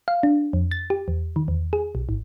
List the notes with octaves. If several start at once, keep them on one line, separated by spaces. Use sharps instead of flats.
F5
D4
F2
A6
G4
E2
D#3
E2
G#4
B1
G#1